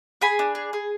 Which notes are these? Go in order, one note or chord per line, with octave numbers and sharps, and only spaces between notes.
G#4 G#5 B5
D4
G#4
G#4